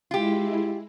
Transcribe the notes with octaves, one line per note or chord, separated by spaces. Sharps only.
G#3 E4 F4 G4